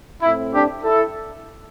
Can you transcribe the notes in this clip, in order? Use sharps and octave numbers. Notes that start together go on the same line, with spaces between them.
A2 A3 C4 E4
D4 G4
E4 A4